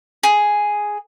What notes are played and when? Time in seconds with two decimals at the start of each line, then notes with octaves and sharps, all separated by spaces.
0.23 G#4